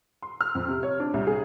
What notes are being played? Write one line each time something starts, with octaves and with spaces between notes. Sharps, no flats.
C6
F6
F2
C3
C#5
D4
C2
G#4